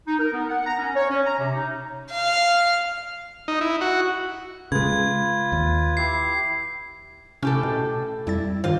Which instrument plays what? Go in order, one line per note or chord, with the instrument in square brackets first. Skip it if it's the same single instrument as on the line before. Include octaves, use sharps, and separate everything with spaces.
[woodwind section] D#4
A#4
B3
F#5
A#5
C#4
C#5
C#4
A#5
C3
D#4
[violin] F5
[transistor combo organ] D#4
E4
F#4
[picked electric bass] C#3 G#3 [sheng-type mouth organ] F4 B4 [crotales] G#6
[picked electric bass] D#2
[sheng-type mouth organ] E4 G4 [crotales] C7
[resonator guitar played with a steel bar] A2 G4 A4 [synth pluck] C3 C#4
[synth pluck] B2
[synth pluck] F2 G3 A6 [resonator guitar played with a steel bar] E4
[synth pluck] G2 D#3 C5 [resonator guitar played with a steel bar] F4